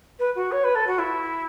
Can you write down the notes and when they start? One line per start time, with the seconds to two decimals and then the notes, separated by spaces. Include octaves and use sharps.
0.19 B4
0.35 F#4
0.51 C#5
0.64 B4
0.75 A4
0.87 F#4
0.98 E4